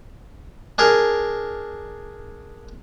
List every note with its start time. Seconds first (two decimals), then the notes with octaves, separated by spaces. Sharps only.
0.78 D4 G#4 A#4